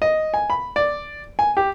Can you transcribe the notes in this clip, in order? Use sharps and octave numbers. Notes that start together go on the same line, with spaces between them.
D#5
G#5
B5
D5
G#5
G4